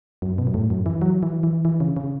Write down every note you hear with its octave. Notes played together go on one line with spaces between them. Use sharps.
F#2
B2
F#2
A2
F#2
E3
F#3
E3
E3
E3
C#3
C#3